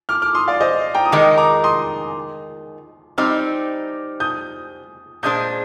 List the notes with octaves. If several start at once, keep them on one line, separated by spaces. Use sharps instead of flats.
D6 F6
D6 F6
C6 D#6
D5 F5
C5 D#5
G5 A#5
D#6
D#3 G#3 D#4 A#4 A#5 D6
A#5 D6
C6 D#6
G3 C4 D#4 D6 F6
D#6 G6
A#2 G#3 D4 G#4 C5 D#6 G6